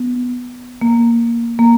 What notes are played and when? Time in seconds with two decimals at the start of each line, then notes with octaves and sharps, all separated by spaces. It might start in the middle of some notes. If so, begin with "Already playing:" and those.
Already playing: B3
0.81 A#3
1.59 A#3